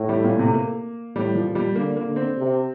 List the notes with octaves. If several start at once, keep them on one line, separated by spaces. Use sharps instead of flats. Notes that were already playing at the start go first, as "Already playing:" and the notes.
Already playing: A2
G3
A#2
C3
A3
A#3
A2 G3
F3
A#2
G3
D3 A#3
A#3
D3
C4
C3